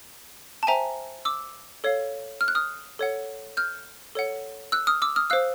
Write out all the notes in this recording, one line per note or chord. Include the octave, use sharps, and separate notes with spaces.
A5
C5 E5 G5 G#5 A#5
D6 E6
A4 C#5 F5
F6
F#6
D#6 F6
A4 C#5 F#5
F6 G6
A4 C#5 F#5
E6 F#6
D#6 F6
D6 E6
D#6 F6
C5 F5 E6 F#6